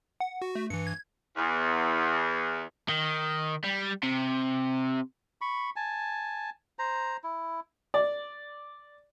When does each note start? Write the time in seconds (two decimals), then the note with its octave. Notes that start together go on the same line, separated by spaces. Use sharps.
0.20 F#5
0.42 F#4
0.55 A3
0.70 G2 E3 C#7
0.87 G#6
1.37 E2
2.89 D#3
3.64 G3
4.03 C3
5.41 B5 C#6
5.76 G#5 A5
6.79 C5 A#5
7.24 E4
7.94 D5